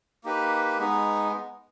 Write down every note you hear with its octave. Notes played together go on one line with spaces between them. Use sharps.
A#3 D#4 G4 B4
G#3 B3 D#4